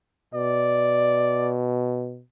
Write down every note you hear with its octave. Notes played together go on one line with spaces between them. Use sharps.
B2 D5